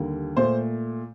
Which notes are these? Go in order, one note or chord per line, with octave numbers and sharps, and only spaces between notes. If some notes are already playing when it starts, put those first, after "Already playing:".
Already playing: D#2 D3 G3 A#3
A#2 A3 C5